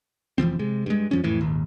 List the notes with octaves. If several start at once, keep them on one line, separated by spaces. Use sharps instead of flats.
F1 E3 F3 C4
C3 G#3
G2 G#3
F#2 F3 C#4
F2 A2 E3
D#1 G#1 D#2